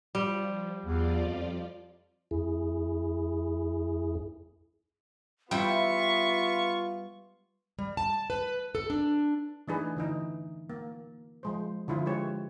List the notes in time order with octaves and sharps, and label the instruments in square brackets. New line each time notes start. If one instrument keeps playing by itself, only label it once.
[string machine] F3 [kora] G3
[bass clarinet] E2 [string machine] F3 F4 D5
[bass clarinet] F2
[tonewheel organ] F2 E4 G#4
[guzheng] G3 E4 [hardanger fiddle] B3 C#6 [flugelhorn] F4 [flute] E5
[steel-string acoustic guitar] G3
A5
B4
A4
D4
[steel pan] E3 A3 D4 D#4 G#4 B4
D3 E3 D#4
A#3
F3 G#3 C5
D3 F3 E4 F4 C5
G#3 G4 B4 C#5